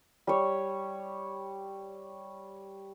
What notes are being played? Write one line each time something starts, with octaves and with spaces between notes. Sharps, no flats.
G3 C#5